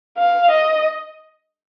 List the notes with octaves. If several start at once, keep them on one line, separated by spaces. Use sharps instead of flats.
F5
D#5